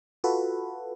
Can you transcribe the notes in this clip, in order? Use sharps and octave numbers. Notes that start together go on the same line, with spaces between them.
F4 F#4 A4 B4